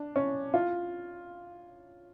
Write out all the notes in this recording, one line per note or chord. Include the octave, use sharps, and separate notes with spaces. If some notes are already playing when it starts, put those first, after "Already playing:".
Already playing: D4
C#4
F4